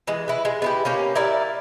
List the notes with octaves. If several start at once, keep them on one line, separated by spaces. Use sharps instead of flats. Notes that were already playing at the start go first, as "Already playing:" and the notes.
E3 G#3
E4 B4
G#3
B3 E4 G4
A#3 C#4 G4
E4 A#4 D5 E5